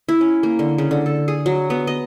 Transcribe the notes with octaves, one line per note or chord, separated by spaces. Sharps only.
E4
C#4
A#3
D3
C#3
D3
A4
G#4
F#3
B3
D#5